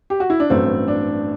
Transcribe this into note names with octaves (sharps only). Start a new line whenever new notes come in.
G4
F#4
E4
D4
A1 G2 F#3 A3 C4
D4